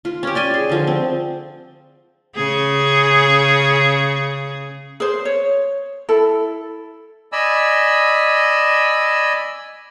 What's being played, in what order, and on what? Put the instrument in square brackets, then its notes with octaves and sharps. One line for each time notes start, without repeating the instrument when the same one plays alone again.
[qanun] F4
C#4 G4
D5 G5 G#5
G#4
D3 F3
C4
[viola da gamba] C#3 G#4
[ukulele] G#4 C5
C#5
E4 A4
[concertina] D5 D#5 G#5 B5 E6